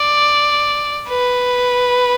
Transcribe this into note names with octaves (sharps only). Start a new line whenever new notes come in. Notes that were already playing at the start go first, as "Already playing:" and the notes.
Already playing: D5
B4